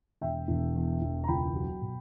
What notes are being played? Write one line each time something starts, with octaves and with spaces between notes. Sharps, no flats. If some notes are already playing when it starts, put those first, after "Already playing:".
E1 E5 G5
E1
E2
E1
A#5
C#2 G5 B5
F#3
B2